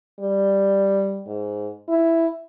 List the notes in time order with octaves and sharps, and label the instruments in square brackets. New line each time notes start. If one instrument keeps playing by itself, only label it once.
[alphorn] G3
G#2
E4